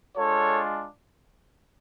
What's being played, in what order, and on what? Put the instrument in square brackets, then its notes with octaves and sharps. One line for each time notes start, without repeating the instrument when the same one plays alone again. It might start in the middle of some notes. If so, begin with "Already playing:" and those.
[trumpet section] G#3 D4 F4 A4 C#5